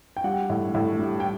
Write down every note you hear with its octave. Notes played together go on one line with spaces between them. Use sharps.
G5
G3 F#5
A2
A2
G3
G5